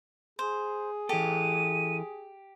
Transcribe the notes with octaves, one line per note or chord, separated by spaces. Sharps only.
G#4 C5
E3 G4 A4 D#7